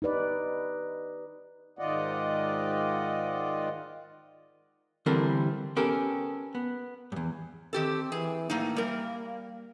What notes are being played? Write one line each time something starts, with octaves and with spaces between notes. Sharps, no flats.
D#4 G4 B4 D5
G#2 D#3 F4 D5 D#5 F#5
D3 E3 G3 C4 A4 A#4
B3 C#4 G4 A4 A#4
B3
E2 G2
D#3 C4 G4 A4
E3 G#4
A2 F#3 A#3 D#4
G3 A#4